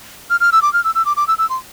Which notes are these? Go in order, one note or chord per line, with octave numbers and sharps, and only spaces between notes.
F6
F6
E6
D6
F6
E6
E6
D6
D6
E6
E6
C6